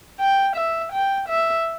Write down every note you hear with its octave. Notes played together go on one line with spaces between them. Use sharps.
G5
E5
G5
E5